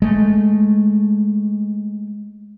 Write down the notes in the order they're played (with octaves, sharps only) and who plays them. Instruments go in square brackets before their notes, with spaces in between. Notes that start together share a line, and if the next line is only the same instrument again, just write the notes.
[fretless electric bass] G#3 A3